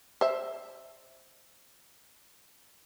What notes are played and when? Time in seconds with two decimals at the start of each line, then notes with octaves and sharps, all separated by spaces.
0.21 C5 E5